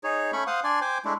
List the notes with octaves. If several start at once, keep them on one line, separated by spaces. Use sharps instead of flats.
D#4 G#4 C#5
A3 C#4 B5 C#6
C5 F5 F#5 D#6
D4 D5 G#5 C6
C5 G5 G#5 D6
G#3 A3 D4 E4